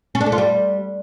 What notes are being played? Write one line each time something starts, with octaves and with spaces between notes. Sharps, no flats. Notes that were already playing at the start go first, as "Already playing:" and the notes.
C#4
D4
A3
F4
G3